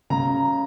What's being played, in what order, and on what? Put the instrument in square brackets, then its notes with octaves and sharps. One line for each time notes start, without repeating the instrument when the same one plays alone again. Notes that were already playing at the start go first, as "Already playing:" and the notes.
[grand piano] C#3 A#5